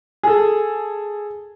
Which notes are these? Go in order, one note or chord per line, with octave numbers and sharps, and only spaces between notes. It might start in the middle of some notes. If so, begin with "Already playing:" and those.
G#4 A4